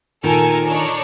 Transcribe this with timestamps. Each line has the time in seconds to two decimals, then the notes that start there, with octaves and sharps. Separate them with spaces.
0.24 A#2 D#3 A4 A#4 G#5
0.65 D4 D#4 C#5